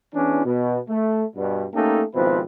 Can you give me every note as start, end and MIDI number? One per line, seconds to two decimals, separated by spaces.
0.14 0.45 40
0.14 0.45 52
0.14 0.45 61
0.14 0.45 62
0.46 0.78 47
0.89 1.23 57
1.36 1.65 43
1.36 1.65 47
1.74 2.03 57
1.74 2.03 58
1.74 2.03 61
1.74 2.03 63
1.74 2.03 67
1.74 2.03 69
2.15 2.40 32
2.15 2.40 47
2.15 2.40 53
2.15 2.40 60
2.15 2.40 64
2.15 2.40 71